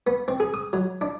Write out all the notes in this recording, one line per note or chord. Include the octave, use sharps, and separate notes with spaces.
B3
C4
G#4
D#6
F#3
D4